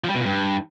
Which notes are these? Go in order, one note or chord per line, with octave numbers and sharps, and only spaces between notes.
F3
G3
B2
A#2
G2